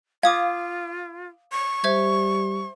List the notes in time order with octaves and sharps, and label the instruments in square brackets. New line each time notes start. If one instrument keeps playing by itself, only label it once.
[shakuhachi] F4 [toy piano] F5 [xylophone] D6 D#6 G#6
[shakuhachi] C#6
[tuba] G3 [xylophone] C5 E5 G#6